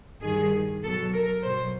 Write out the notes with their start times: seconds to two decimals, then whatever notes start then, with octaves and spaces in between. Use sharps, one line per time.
0.22 G2 D#3 G3 G#4
0.83 B2 F#3 A4
1.13 A#4
1.44 B2 F#3 C5